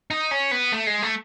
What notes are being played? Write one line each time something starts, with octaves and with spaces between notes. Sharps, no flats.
D#4
C#4
B3
A3
G#3
A3